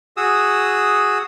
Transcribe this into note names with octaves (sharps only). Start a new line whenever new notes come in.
F#4 G#4 D#6 E6